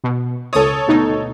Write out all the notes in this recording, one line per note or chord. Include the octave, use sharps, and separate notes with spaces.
B2
C#2 A4 C#5 D#6
D2 B2 D#4